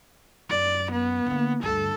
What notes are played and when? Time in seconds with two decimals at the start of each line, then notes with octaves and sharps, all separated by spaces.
0.49 F#2 D5
0.91 B3
1.27 D3 A#3
1.63 D2 G2 A4